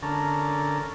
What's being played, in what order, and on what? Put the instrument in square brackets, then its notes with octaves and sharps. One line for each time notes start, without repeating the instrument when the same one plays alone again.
[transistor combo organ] D3 C#4 A4 A#4